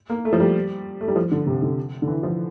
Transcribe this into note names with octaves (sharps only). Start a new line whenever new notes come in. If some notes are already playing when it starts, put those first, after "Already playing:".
A#3
A3
F3
G3
A3
G3
F3
D3
C3
D3
D3
E3
F3